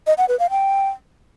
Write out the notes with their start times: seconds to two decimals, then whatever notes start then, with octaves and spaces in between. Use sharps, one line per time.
0.07 D#5
0.18 F#5
0.29 B4
0.39 F5
0.50 G5